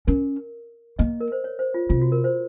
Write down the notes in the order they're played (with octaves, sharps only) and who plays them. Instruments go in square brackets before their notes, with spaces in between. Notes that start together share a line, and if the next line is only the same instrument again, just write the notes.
[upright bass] C#4 [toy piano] A#4
[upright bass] A#3 [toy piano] D#5
[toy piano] A#4
C5
C#5
C5
F4
[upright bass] C3 [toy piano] F4
[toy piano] F#4
A#4
C5